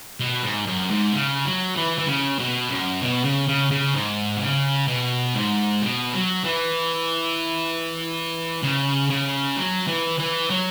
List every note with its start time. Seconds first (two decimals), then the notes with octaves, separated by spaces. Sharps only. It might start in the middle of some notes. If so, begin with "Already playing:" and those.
0.20 B2
0.43 G#2
0.66 F#2
0.90 G#2
1.13 C#3
1.45 F#3
1.76 E3
1.98 E3
2.07 C#3
2.39 B2
2.69 F#2
3.01 B2
3.24 C#3
3.48 C#3
3.71 C#3
3.94 G#2
4.36 B2
4.41 C#3
4.88 B2
5.35 G#2
5.82 B2
6.13 F#3
6.44 E3
8.63 C#3
9.10 C#3
9.57 F#3
9.88 E3
10.19 E3
10.50 F#3